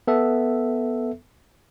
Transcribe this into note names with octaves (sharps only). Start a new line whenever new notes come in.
B3 A4 E5